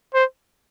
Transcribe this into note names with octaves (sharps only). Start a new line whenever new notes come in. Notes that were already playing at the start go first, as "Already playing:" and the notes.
C5